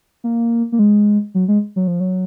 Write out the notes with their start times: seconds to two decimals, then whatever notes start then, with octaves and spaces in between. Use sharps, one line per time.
0.24 A#3
0.72 A#3
0.79 G#3
1.34 F#3
1.48 G#3
1.76 F#3
1.87 F3
2.00 F#3